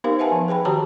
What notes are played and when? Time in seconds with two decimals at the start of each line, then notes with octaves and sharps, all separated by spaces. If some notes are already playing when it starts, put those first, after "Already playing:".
0.04 B3 D#4 G4 A#4 C5 F5
0.19 B4 E5 F#5 G#5 A5
0.32 F3
0.48 G#4 B4 G5 B5
0.65 D#3 F#4 G4 C#5 A5 A#5